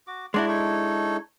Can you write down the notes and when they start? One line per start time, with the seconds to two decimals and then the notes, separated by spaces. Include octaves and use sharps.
0.07 F#4 D6
0.34 G#3 D4 E4 F#4 D5 C6
0.48 D#4 A4 C#5